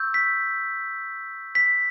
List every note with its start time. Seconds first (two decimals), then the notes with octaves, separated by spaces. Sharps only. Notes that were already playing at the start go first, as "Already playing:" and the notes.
Already playing: C#6 E6 G6
0.14 B6
1.55 B6